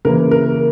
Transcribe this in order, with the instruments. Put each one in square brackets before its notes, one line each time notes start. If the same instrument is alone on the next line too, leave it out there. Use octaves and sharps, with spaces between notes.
[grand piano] C#3 E3 A#3 A#4
A#4